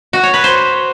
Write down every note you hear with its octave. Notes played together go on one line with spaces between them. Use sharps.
F#4
C#5
B4
C5